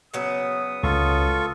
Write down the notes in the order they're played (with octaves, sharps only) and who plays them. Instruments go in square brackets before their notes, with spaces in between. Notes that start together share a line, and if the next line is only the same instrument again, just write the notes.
[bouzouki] C#3 F#3 B3 [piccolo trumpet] D#6
[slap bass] C#2 [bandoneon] F4 A4 C#6